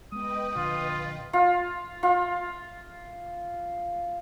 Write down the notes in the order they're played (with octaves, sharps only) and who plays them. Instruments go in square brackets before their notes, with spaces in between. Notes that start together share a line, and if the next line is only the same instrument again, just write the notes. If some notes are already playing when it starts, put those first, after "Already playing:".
[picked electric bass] G#3 B3 [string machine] B4 D#5 G5 [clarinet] D#6
[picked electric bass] A#1 D3 [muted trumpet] F4
[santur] F4
F4